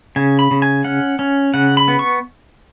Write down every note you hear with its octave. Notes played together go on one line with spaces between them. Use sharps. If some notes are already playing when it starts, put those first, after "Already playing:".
C#3 G#5
B5
C#3
G#5
C#4 F#5
C#4
C#3 F#5
B5
B3
C#6